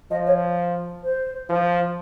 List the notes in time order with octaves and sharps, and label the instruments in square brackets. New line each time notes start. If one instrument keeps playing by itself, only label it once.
[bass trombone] F3 [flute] D#5
[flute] C#5
C5
[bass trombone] F3